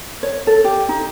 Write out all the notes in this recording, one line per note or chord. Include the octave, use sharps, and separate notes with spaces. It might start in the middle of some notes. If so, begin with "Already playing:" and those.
C#5
A4
G4
D#4